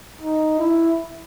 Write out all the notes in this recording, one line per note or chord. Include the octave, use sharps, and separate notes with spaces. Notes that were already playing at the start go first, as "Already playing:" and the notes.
D#4
E4